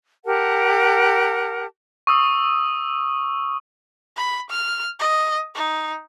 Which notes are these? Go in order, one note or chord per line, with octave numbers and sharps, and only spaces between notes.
G4 A#4 F#5 A5
C#6 D#6 E6
B5
F6
D#5
D#4